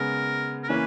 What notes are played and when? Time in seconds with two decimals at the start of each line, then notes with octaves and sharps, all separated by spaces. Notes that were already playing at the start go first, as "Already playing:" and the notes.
Already playing: C#3 G#3 B3 A#4
0.63 A#4
0.69 E3 A#3 C#4 B4